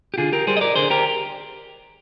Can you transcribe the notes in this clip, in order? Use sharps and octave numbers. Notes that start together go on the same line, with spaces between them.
G4
D3 F4 G#4
G4 A#4
G3 G#4 C5
D#5
A#4 D5
D3 G#4 C5
G4 A#4